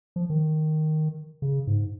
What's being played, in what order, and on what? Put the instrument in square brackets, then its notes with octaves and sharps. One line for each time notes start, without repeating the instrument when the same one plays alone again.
[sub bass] F3
D#3
C#3
G#2